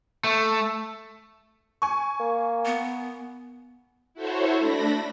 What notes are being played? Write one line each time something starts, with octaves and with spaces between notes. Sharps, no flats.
A3
G#5 C#6
A#3
B3
E4 F#4 A4 C5 C#5
A3 D4 B5 A#6